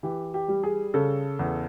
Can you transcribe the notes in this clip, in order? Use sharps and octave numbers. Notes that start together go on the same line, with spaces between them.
E3 G4
G4
G3
G#4
C#3 A4
E2